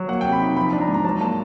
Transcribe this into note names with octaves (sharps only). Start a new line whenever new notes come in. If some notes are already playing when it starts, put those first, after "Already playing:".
Already playing: F#3
A#3 F#5
G5
C3
B5
D#4
F3 B5
D4
A#5
G#2
A#5
F#3 A5
A#3 A5